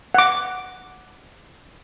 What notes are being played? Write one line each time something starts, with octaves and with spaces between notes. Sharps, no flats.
F#5 D6